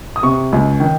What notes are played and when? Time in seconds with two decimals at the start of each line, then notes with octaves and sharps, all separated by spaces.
0.16 D#6
0.23 C3 C#6
0.52 C#2
0.80 D#3